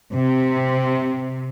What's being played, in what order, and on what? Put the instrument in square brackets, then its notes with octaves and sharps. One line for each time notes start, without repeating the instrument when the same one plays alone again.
[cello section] C3